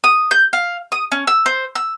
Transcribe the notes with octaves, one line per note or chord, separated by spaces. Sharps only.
D#6
G6
F5
D#6
C#4
E6
C5
E6